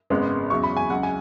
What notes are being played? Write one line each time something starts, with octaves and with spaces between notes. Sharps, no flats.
G#1 F#2 C#3 G#3 B3
E2 C#3 F#3 C#6
B5
G#5
C#2 C#3 F#3 F#5
G#5